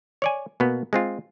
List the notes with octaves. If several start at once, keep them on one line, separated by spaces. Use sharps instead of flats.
C#5 D5 G#5
B2 A#3 B3
G#3 C4 F4